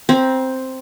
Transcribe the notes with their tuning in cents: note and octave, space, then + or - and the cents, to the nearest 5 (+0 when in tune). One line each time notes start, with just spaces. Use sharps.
C4 +0 A#5 +40